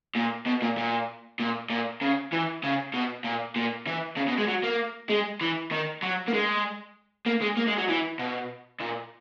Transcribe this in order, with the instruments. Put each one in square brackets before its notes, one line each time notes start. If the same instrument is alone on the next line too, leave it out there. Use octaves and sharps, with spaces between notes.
[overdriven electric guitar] A#2
B2
A#2
A#2
A#2
A#2
C#3
E3
C#3
B2
A#2
A#2
E3
C#3
B2
G#3
F#3
A#3
G#3
E3
D#3
F#3
A#3
G#3
A#3
G#3
A#3
G#3
F#3
E3
B2
A#2